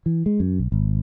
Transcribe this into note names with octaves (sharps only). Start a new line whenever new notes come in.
E3
G#3
F#2
B1
G#1